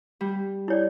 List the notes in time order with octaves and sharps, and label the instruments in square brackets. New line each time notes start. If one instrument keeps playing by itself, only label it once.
[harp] G3
[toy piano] E4 C#5 D5